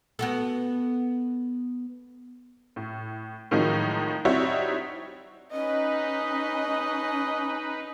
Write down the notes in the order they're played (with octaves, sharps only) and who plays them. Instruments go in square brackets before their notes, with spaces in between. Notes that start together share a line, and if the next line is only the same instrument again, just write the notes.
[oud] B3 F#4 A4
[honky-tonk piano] A2
A2 D#3 F3 F#3 G#3 D#4
G3 C4 D#4 E4 F#4 C#5
[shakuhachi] C#4 [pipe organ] D#4 B4 [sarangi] D#5